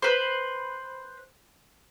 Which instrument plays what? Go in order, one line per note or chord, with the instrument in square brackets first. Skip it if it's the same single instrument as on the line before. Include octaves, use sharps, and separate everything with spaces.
[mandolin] B4 C5